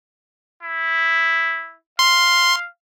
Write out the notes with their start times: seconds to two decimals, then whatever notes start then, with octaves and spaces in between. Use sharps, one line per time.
0.62 E4
1.99 F5 C6